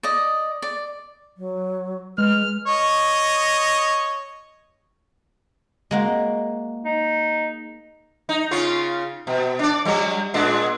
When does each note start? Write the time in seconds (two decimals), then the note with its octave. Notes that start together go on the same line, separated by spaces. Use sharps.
0.03 D5 D#5
0.62 D5
1.38 F#3
2.18 G#3 B4 F6
2.67 C#5 D#5
5.91 G#3 A#3 F#4
6.85 D#4
8.29 D#4
8.51 C#3 C#4 F4
9.27 B2
9.59 D4 D5
9.85 F#3 G3
10.34 A#2 G#3 D4